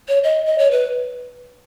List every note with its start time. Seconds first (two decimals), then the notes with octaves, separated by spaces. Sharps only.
0.08 C#5
0.24 D#5
0.46 D#5
0.58 C#5
0.71 B4